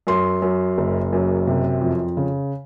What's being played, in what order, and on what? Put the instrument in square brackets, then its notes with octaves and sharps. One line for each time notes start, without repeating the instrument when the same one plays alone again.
[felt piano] F#2 C6
F#2
F#1
F#2
C3
F2
C#3